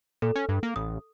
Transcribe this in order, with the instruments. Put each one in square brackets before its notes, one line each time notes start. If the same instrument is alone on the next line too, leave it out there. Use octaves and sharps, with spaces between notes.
[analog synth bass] A#2 [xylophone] A4
[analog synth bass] C#4
G2
A#3
[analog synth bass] A1 [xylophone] D#6